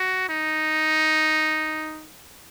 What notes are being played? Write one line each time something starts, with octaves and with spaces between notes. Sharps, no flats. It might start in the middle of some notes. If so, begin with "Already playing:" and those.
Already playing: F#4
D#4